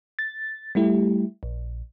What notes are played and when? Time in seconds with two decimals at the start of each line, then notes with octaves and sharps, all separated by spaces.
0.19 A6
0.75 G3 A3 E4 G4
1.43 A#1